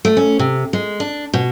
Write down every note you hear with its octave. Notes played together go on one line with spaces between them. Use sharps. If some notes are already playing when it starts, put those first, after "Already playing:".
A3
C#4
C3
G#3
D4
B2